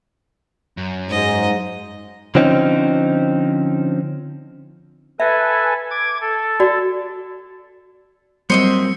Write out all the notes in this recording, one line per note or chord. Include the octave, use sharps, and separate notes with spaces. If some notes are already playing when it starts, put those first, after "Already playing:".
F#2
G#2 D#5
D3 F3 C4 C#4 D#4
A4 B4 E5 G#5
D6 G#6
A4
F#4 D5
F#3 G3 A#3 C4 C5 D#5 E5 C#7